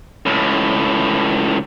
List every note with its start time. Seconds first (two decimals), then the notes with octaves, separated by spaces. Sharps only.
0.26 C#2 A2